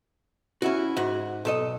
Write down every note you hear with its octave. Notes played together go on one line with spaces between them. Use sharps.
C#4 E4 F#4
G#2 F#4
B1 A4 D#5